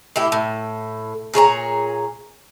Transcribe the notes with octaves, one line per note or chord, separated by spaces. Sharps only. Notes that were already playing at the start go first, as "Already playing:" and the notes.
A2 E4 G4
A2
A#2 G#4 C#5 A#5